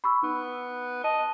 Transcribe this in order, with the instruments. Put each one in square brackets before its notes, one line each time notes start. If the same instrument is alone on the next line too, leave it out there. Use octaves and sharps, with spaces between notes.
[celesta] B5 C#6 E6
[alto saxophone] B3 [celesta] D#4
[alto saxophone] D#5 [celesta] A5